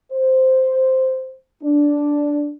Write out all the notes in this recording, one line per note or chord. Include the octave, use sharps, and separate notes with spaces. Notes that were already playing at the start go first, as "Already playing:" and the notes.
C5
D4